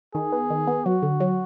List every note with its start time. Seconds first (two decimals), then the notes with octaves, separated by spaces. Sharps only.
0.14 D#3 G#4
0.32 B3
0.50 D#3
0.67 B3
0.85 F#3 F#4
1.02 D3
1.20 F#3